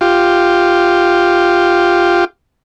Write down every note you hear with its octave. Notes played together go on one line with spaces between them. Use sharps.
F4 G4